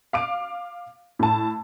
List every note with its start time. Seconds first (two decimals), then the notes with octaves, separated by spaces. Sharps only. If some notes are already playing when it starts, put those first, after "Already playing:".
0.13 F5 D6 D7
1.19 A2 A5